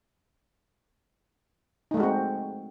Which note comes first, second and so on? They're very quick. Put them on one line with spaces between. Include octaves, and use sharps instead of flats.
D#4 A3 G#3 F#4 C4